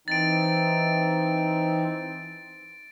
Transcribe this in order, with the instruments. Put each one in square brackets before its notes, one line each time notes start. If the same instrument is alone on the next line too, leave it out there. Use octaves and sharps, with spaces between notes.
[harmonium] E3 C4 D#4 [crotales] A6 D7